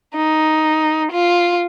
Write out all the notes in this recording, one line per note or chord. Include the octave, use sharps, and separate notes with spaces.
D#4
F4